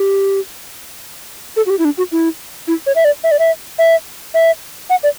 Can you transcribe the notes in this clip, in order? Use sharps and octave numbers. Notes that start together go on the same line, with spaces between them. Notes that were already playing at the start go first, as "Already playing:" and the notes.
Already playing: G4
A4
F#4
G4
E4
D4
F#4
E4
E4
C#5
E5
D5
E5
D5
E5
E5
E5
F#5
D5